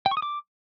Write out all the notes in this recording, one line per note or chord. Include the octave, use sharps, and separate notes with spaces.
G5
C#6
D#6
D6